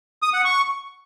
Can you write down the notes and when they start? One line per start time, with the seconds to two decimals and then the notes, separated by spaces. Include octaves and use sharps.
0.22 D#6
0.34 F#5
0.45 C#6